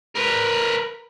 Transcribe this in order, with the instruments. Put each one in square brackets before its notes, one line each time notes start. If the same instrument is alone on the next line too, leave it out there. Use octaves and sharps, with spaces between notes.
[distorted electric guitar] A#4 B4